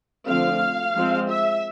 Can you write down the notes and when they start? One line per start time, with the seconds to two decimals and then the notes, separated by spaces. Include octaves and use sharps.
0.27 D3 F3 A3 C4 F5
0.95 F3 G#3 C4
1.29 E5